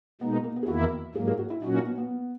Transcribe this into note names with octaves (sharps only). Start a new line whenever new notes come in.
B2 G#3 B3 D#4
A#3
A#3
B3
G#4
E2 D#3 A#3 E4 F#4
G#2 F#3 A#3 G#4
G#4
F#4
E4
A#2 F#3 C#4 D#4 F#4
D#4
B3
B3